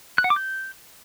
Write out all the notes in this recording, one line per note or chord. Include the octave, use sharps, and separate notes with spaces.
F#6
F#5
D6
G6